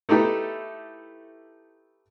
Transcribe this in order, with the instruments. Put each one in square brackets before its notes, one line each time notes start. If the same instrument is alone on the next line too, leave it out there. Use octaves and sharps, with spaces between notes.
[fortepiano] A3 D#4 E4 G4 A4 B4